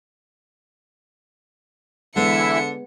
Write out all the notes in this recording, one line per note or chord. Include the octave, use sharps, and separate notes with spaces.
D3 E3 G#3 B3 E4 E5 C#7